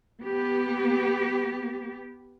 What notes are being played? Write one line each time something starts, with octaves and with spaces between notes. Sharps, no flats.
B3 G4